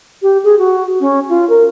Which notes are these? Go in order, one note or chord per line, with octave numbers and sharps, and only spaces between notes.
G4
G#4
F#4
C#4
F4
A#4